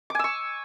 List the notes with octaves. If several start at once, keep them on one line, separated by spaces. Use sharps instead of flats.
G#5 C#6 D6 E6